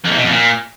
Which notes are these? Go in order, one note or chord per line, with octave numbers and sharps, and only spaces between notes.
F2
E2
B2
F2
A#2